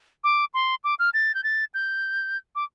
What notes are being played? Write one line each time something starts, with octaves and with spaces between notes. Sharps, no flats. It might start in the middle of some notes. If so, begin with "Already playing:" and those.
D6
C6
D6
F6
A6
G6
A6
G6
D6